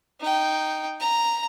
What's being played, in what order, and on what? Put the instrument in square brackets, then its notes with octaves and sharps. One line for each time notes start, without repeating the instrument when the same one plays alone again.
[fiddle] D#4 G5
A#5